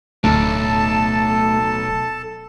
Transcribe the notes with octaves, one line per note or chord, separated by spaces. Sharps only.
D1 B1 A3 A4 A5